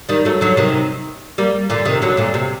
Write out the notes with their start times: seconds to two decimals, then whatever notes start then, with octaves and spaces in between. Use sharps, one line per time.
0.09 D#3 G3
0.25 F#3 A3
0.41 D3 F#3
0.57 C3 D#3
1.38 G3 A#3
1.70 A#2 D3
1.85 C3 D#3
2.02 D3 F#3
2.17 A#2 D3
2.34 C3